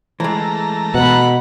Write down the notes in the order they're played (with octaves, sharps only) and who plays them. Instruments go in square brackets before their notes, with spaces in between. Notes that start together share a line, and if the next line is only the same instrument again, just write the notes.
[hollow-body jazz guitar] E3 G#3 [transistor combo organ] A3 A#5
[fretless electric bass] B2 [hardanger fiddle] F#5 B5